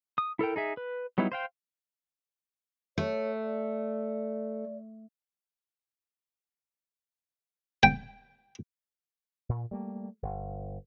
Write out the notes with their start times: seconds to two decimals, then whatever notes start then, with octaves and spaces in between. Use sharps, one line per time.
0.18 D#6
0.39 E4 A4 A#4 G5
0.56 D#4 G#4 E5
0.77 B4
1.18 F#3 G3 B3 D#4 E4
1.32 C5 F5 G5
2.98 A3 C#5
3.43 D5
7.83 G5
9.49 A#2
9.71 G3 A3 A#3
10.22 G1